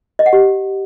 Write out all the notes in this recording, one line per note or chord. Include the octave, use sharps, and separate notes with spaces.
D#5
F#5
G4